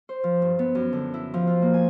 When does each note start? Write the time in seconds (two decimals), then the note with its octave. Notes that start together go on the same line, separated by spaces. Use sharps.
0.09 C5
0.24 F3
0.42 G2
0.59 B3
0.75 F#2
0.93 D3
1.14 E4
1.34 F3
1.47 F4
1.62 A#3
1.74 G#5